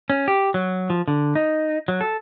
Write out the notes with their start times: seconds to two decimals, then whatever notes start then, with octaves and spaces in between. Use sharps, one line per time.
0.10 C#4
0.28 G4
0.54 F#3
0.90 F3
1.08 D3
1.35 D#4
1.88 F#3
2.01 A4